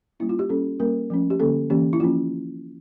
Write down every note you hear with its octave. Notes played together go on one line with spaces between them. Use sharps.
G3 A#3 C#4 E4
F4
G4
G3 A#3 C#4 A4
G3 A#3 C#4 A#4
F3 A3 C#4
G4
D3 G3 A#3 C#4 A4
E3 A#3 C#4 G4
E4
F3 A#3 C#4 F4